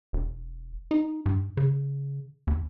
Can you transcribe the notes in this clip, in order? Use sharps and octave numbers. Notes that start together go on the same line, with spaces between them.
E1
D#4
G2
C#3
D#2